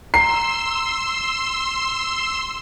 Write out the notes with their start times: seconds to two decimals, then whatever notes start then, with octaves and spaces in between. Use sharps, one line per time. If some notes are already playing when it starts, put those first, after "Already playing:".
0.14 A#5 C6 E6 C7